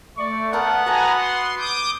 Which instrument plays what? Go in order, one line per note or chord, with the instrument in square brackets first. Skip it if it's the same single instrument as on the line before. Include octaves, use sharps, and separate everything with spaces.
[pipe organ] A3 [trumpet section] D5 C#6
[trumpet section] B3 [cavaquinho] A#4 F5 A5 [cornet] F#5
[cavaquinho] F#4 A4 D#6 [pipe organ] B4 G#5 A#5
[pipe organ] C6
D6 D#6 G6